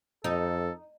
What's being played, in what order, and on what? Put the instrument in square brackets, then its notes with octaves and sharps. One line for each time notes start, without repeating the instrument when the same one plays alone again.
[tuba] F2 [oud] D#4 [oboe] A4